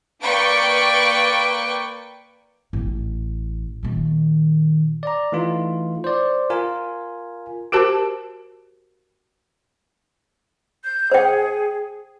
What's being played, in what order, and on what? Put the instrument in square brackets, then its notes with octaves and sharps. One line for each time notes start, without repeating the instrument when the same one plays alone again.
[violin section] A#3 B4 D5 G5 C#6 D7
[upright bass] A1
A#2 D#3
[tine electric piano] D5 A#5
E3 A3 D#4 F4
C5 D5
F4 A#4 G#5
[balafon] F#4 G4 A#4 C5 A5
[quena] G6
[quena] G#4 [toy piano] C5 G5